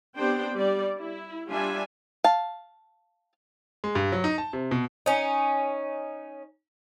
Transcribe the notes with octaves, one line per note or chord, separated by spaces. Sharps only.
B3 C4 D4 G4 C5 G5
G3 D5
E4
G3 D4 F4 E5 G#5
F5 A5
G#3
G2
F#3
D#4
A5
C3
B2
C#4 D#4